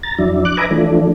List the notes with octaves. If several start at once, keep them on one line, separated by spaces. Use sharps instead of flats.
A#5 A6
F2 F#3 D4 E4
D6 F#6
B4 D#5 E5 G#5 A#5 D6
E3 F3 A3 D4